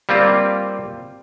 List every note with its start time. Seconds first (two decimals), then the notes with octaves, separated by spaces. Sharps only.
0.09 G3 A#3 C4 F4